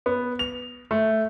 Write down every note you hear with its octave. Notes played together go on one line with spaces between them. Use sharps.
B3
F7
A3